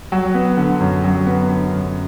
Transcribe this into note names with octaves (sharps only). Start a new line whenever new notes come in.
F#3
B3
D3
F#2
F#3
B3
D3
F#2